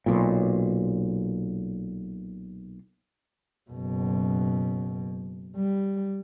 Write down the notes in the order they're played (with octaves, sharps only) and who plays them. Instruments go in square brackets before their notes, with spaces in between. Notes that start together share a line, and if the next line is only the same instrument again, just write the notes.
[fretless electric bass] B1 A#2
[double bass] F#1 B2
G3